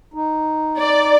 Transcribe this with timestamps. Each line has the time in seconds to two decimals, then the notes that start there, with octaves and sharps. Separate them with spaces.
0.14 D#4
0.80 D5